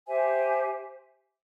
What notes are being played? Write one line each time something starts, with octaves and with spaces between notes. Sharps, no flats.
G4 C5 E5 G#5